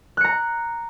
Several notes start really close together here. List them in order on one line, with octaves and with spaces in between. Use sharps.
F#6 C#7 A#5